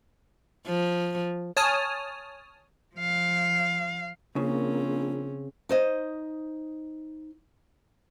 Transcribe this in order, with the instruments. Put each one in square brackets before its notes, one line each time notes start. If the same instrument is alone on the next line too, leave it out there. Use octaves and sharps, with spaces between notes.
[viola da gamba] F3
[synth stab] C#5 G#5 A5 D#6 F6
[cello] F3 F5
[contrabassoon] A#1 [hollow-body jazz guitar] C#3 [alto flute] A#3 [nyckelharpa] C4 C#4
[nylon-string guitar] D#4 C5 D#5